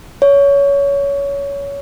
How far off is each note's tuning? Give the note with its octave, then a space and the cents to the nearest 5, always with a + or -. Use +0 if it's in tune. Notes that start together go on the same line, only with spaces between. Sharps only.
C#5 +20